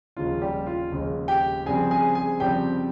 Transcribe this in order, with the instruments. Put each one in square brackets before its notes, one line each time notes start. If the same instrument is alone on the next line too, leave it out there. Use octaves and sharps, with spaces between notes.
[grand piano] F1 D#2 C#3 G#3 F4
G3 G4
F4
F1 D#2 C#3 G#3
G4 G5
F1 F2 C#3 G3 C4 G#4 G#5
G#4 G#5
G#4 G#5
F1 F2 C#3 G3 C4 G4 G5